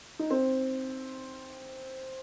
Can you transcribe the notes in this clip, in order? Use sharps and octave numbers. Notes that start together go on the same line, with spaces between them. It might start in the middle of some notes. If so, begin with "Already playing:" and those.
D#4
C4